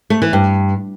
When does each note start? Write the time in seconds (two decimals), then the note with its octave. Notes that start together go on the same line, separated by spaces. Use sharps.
0.10 A3
0.22 E3
0.33 G2